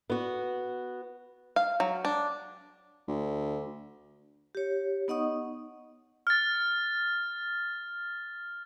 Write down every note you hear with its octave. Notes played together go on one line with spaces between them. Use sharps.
B3 F#4
F5
F#3
D4
D2
G4 C#5
B3 D#4 D#5 F#5 C#6 D#6
F6 A6